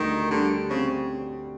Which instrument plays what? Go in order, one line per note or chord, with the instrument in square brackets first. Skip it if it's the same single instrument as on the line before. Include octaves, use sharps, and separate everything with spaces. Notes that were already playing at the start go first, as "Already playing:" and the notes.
Already playing: [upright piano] D2 G3 [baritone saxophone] D#3
[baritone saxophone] D3 [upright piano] G3
[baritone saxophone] C#3 [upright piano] C4